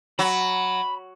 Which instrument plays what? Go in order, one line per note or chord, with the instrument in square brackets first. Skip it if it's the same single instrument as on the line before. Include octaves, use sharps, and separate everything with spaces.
[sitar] F#3 [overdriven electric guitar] B5